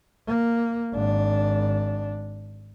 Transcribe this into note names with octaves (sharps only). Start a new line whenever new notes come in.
A#3
G#1 D4